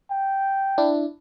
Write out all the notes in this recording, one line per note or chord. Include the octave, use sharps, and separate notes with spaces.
G5
D4 E4